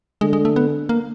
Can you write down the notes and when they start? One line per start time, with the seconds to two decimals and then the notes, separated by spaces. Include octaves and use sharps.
0.21 D3 G#3
0.33 G#3
0.45 A3
0.56 B3
0.89 A#3